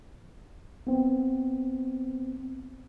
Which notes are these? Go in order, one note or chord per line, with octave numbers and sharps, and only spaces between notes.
B3 C4